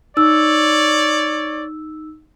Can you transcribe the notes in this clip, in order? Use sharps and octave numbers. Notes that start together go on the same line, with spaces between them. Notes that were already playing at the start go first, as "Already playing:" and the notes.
D#4 C#5 D5 E6